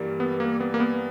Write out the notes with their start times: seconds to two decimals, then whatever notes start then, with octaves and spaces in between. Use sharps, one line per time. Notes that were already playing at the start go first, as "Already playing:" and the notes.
Already playing: G2 E3 G3 A#3
0.20 B3
0.40 A#3
0.60 B3
0.74 A#3
0.80 B3